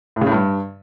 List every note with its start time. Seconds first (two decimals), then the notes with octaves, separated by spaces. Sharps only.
0.16 A2
0.21 C#3
0.27 A2
0.32 G2